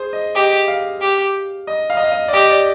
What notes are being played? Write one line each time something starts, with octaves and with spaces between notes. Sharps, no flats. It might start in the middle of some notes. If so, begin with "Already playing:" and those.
Already playing: G#4 C5
D#5
G4 D#5
F5
G4
D#5
F5
D#5
F5
D#5
D5
G4 D#5
D5